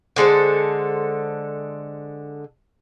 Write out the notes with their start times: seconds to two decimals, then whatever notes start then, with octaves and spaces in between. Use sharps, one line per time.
0.16 D3 G#3 A4 C5